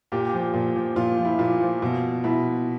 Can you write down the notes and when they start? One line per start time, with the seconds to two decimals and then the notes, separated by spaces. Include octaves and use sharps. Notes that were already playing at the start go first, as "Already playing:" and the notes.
0.12 A#2 G4
0.33 F3
0.53 A#2
0.76 F3
0.96 A#2 F4
1.17 F3
1.25 E4
1.39 A#2 F4
1.61 F3
1.82 B2
2.24 B2 E4